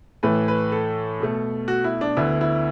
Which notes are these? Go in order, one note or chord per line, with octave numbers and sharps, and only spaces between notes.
A2 E3 A3 B4
B4
A4
B2 A3
F#4
E4
D4
D2 D3 B3 E4
E4